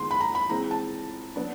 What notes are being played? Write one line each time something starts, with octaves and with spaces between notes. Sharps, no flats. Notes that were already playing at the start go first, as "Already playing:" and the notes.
Already playing: D#3 G#3 B3 C6
B5
A#5
B5
E3 G#3 C4 A#5
A5
F#3 B3 D4